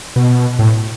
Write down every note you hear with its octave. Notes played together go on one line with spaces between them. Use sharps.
B2
A2